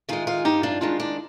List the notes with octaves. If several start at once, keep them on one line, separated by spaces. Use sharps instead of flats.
D#3 G#3 F4 G#4
F4 G#4
G2 D#4 G4
D4 F4
D#3 G#3 D4 F4
D4